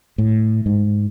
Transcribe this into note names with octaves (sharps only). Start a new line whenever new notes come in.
A2
G#2